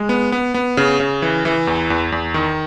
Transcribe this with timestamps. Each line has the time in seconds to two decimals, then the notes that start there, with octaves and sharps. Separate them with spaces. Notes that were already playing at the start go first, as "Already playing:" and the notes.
Already playing: G#3
0.09 B3
0.32 B3
0.54 B3
0.77 C#3
1.00 C#3
1.22 E3
1.45 E3
1.67 E2
1.90 E2
2.12 E2
2.34 D#3